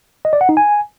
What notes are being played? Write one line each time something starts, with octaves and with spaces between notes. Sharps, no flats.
D#5
D5
F#5
D#4
G#5